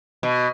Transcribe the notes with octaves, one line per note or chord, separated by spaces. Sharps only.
B2